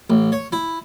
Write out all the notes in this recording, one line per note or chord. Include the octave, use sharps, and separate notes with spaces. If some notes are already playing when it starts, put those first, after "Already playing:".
A1
C#5
E4